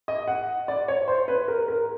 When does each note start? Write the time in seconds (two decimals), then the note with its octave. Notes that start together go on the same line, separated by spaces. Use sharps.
0.08 D#5
0.28 F#5
0.68 D5
0.88 C#5
1.08 C5
1.28 B4
1.48 A#4
1.68 A#4